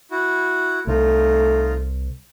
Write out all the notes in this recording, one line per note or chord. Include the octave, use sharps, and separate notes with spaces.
E4 F#4
C2 A3 D#4 F4